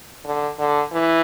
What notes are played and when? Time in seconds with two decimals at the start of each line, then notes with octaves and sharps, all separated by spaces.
0.25 D3
0.59 D3
0.93 E3